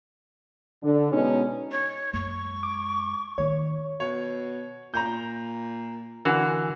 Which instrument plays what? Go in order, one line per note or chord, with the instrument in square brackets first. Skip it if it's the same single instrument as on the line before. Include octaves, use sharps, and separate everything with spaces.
[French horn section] D3
B2 G#3 C#4 D#4
[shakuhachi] C#5
[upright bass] F#2 G#3 [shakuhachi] C#6
[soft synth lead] D6
[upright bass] D#3 D#4 [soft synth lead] C#5
[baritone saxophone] B2 [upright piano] C#5
[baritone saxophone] A#2 [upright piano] A#5 G6
[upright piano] D3 [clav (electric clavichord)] E3 F#4 F5 [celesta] A#4 F#5 G#5